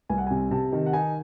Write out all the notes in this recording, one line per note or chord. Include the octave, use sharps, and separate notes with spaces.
C2 G#5
F#5
C3 G#5
C3 A5
D#3
F#5
D#4 G#5